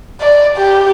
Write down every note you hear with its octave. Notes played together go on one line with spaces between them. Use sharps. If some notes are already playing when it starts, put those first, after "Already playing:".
D5
G4